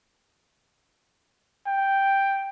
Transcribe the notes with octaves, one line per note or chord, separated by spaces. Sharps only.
G5